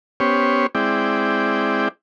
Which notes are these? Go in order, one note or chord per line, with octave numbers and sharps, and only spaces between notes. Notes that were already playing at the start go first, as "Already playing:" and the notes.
B3 C#4 G4 C5 C#5
G#3 C4 E4 D5 G5